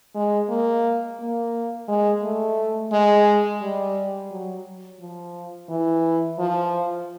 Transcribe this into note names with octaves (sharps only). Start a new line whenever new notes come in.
G#3
A#3
A#3
G#3
A3
G#3
G3
F#3
F3
E3
F3